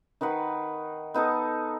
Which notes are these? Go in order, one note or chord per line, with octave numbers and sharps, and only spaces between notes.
D#3 D#4 B4 F#5
B3 D#4 A4 A5